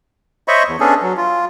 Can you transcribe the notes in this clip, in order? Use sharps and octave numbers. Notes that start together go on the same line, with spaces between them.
C5 C#5 D#5 E5 B5 C#6
E2
B3 C#4 D4 G#4 A4
F#3
F4